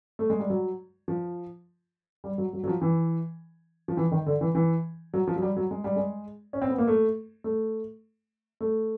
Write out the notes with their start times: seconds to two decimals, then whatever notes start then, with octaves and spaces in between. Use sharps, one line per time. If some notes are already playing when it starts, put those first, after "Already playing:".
0.19 A3
0.30 G#3
0.40 G3
0.50 F#3
1.08 F3
2.24 G3
2.38 F#3
2.53 F#3
2.64 F#3
2.67 F3
2.81 E3
3.88 F3
3.97 E3
4.12 D#3
4.26 D3
4.41 E3
4.55 E3
5.14 F#3
5.28 F3
5.36 F#3
5.42 G3
5.57 F#3
5.71 G#3
5.84 G3
5.96 G#3
6.53 C#4
6.62 C4
6.69 B3
6.78 A#3
6.88 A3
7.44 A3
8.61 A3